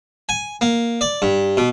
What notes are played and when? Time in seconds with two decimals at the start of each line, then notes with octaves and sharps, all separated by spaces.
0.29 G#5
0.61 A#3
1.01 D5
1.22 G2
1.57 B2